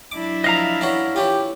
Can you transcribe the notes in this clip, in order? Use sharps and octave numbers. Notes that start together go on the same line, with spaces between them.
F#3 D4 E4 D6
F3 D#5 F5 A#5
E3 C#4 F#4
E3 C#4 F4 G4